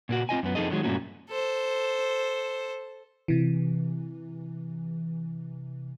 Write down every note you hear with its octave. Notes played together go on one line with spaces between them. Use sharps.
A#2 A#3 F#4
C4 F4 D#5 G#5
F#2 B3
F2 D3 D#4 G#4 A4 D#5
D3 D#3 F#3 G#3
G2 A#2 A3 A#3 C#4 F#4
A4 C5
C3 E3